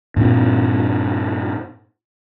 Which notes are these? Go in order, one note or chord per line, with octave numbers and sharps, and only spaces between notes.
G2 A#2 B3 C4